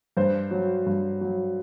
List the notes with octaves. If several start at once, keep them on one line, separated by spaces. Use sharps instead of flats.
G2 C5
F#3
G2
F#3